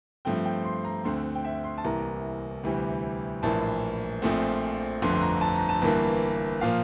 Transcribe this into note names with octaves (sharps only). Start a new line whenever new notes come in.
G2 F3 A3 C4 G5
G5
C6
A#5
D2 D3 A3 C4 C6
G5
E5
C6
A5
C2 C3 E3 A#3 A#5
D2 C3 E3 G3
A#1 A2 E3 A#3 A5
A#1 A#2 F3 A3 C4
G1 F2 D3 A3 C6
C6
A#5
A5
A#5
A5
G1 G2 E3 A#3
A#2 F3 A#3 F5